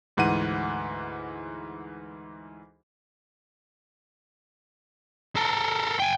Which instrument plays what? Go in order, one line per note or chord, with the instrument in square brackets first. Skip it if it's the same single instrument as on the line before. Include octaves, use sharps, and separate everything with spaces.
[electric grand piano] D2 G#2 E3 F#5 D#7
[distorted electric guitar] A4 A#4
G5 G#5